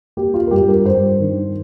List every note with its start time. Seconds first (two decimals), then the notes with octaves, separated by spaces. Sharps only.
0.17 A#3 G4
0.34 F4
0.47 A#4
0.51 G2 G4
0.68 A#4
0.86 G2 C5
1.20 D#3